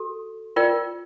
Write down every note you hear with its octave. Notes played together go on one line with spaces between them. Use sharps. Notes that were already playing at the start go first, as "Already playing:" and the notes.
Already playing: F#4 A4
F4 A#4 D5 G5